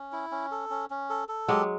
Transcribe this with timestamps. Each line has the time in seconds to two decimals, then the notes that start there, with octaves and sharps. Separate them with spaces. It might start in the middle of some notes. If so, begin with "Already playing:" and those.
Already playing: C#4
0.12 E4
0.32 C#4
0.51 A4
0.70 C#4
0.90 C#4
1.10 A4
1.29 A4
1.48 F#3 G#3 G4